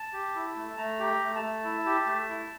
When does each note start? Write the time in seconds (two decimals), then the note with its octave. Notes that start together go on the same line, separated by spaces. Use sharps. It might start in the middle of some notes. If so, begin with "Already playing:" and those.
Already playing: A5
0.13 G4
0.35 E4
0.56 A3
0.77 A3 A#5
0.99 G4
1.06 A#5
1.21 A3
1.35 A5
1.42 A3
1.64 E4
1.86 G4
2.06 A3
2.29 E4